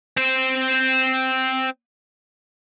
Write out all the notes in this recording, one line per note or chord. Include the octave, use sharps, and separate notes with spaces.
C4 C5